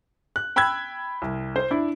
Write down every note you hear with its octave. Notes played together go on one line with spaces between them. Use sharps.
F#6
G5 B5 E6 F#6 G#6
C2
C5
D4 E4